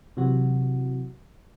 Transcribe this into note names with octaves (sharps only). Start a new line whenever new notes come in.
C3 E3 F#3 F#4